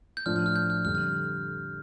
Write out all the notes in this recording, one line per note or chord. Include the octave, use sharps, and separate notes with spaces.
G6
A2 F3 D4 F6
F6
F6
G6
F6
F2 D3 G3 F6
F6